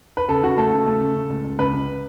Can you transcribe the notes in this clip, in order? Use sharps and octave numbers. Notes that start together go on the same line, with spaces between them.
B4
C#3 A4
C#3 F#4
A3 A4
C#3
A3
C#3
C#3
C#2
C#2
C#2 B4
C#2